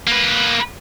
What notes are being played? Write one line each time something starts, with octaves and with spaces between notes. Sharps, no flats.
A#3 B4